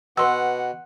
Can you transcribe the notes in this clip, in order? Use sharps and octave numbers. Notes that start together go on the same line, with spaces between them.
B2 B4 F#5 C6 E6